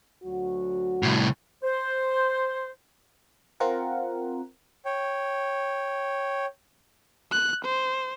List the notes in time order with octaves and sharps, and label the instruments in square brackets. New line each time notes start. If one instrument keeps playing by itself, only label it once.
[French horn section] D2 F#3 F#4
[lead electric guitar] C2 A2
[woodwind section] C5
[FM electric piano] C4 F4 A#4 F#5
[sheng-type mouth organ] C#5 G5
[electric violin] F#6
C5